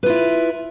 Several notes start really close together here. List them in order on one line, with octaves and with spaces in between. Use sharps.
B4 F4 E4